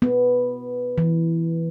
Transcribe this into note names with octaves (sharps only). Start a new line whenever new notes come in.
B3
E3